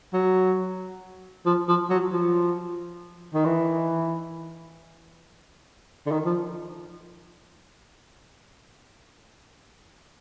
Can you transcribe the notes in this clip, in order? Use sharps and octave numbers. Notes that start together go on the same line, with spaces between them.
F#3
F3
F3
F#3
F3
D#3
E3
D3
D#3
F3